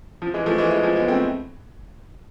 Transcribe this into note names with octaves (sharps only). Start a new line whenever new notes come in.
F3
E3 G#3
F3 A3
E3 G#3
E3 G#3
F3
G#3 B3
A3 C4